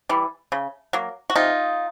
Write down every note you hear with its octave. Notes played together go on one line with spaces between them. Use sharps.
E3 G3
C#3
F#3 A#3
F#4
C3 D#4 F4